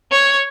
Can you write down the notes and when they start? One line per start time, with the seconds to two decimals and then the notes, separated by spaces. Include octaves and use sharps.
0.11 C#5